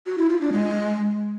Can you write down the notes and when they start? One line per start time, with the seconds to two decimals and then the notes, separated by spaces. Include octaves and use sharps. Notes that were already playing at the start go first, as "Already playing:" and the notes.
0.06 F#4
0.18 E4
0.29 F4
0.41 D4
0.53 G#3